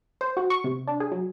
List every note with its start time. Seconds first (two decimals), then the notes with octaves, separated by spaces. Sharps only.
0.21 C5
0.37 F#4
0.50 C#6
0.64 C3
0.88 D4
1.00 G#4
1.12 F#3